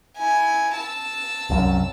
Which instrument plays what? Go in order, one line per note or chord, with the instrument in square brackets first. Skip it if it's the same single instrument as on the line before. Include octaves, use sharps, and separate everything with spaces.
[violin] E4 G#5
A5 E6
[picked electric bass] C2 F#2